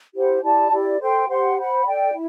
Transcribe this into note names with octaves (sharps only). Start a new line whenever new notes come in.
E4 G4 C5 F#5
E4 G4 D5 A5
E4 G4 D5
A4 C5 G5 C6
G4 C5 F#5 C6
C5 F#5 B5
A4 D5 G5
E4